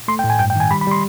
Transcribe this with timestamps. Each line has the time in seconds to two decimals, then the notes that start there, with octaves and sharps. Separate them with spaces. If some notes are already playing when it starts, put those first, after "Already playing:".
0.08 A3 C6
0.19 G5
0.24 A2
0.30 G#5
0.39 G2 G5
0.50 G5
0.56 D#3 G#5
0.71 G3 B5
0.81 B5
0.87 G3 C6